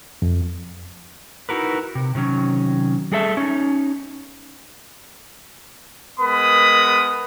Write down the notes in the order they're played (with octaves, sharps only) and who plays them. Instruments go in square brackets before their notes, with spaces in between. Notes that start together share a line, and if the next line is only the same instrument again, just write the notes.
[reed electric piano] F2
[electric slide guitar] D#4 E4 F#4 A#4 B4
C3
C3 D#3 F#3 C#4
G3 G#4 A4 E5
C#4 D#4
[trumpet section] G#3 B3 A#4 B4 B5 D#6